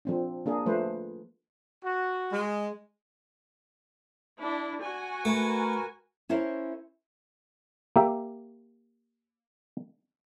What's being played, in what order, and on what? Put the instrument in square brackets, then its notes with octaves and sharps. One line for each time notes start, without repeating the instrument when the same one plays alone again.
[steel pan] F3 C4 D4
A#3 D4 G#4 A#4
F3 A3 B4 C5
[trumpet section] F#4
[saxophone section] G#3
[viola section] D4 E4
F#4 G#5
[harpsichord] A3 [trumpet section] A#4 B4
[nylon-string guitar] C#4 E4 A#4 C5 C#5
[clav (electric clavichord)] A#3 G4 E5